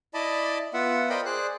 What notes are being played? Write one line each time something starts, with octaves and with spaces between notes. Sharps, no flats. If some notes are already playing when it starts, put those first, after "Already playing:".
E4 D5 D#5 A5 B5
B3 F4 E5 F#5
A#4 C5 D5 D#5 G5 B5
G#4 C5 D5 F#6